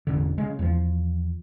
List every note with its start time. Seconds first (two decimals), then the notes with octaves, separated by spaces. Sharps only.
0.07 E1 A1 D3
0.38 C#3 G#3
0.59 E2 F3